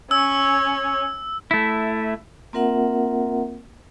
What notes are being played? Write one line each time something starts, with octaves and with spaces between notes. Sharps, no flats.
C#4 C#5 E6
A3 E4
A#3 C4 F4 A#4 E5 F#5